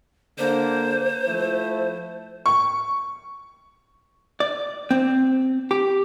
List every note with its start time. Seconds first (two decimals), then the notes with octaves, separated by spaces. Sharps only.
0.38 D3 A#3 D4 C5
1.27 F3 A3 E4
2.46 C#6
4.40 D5
4.91 C4
5.71 G4